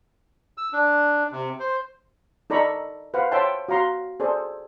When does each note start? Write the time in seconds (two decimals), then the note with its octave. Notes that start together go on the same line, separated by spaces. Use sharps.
0.57 E6
0.73 D4
1.32 C3
1.60 C5
2.50 D#4 A4 D5 A#5 B5 C#6
3.14 B4 C5 F5 F#5
3.31 C5 C#5 E5 G5 A5 C6
3.68 F#4 F5 A#5 C6
4.20 G#4 A4 C5 D5